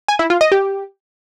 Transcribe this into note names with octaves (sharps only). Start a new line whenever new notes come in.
G#5
E4
F4
D#5
G4